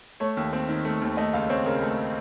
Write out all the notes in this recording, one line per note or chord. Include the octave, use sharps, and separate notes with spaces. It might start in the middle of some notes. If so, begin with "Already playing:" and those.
A3 C#5
D#2
C4
D#3
A3
D#2
A3 D#5
C#2 F5
C4 C#5
C#3 A#4
A3